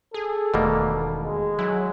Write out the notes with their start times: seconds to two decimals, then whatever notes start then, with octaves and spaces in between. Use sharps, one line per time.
0.14 G#4 A4
0.54 E1 B2 D#3 G3 A3 A#3 D#4
1.23 G#3
1.59 F#3 E4 G#5 F#6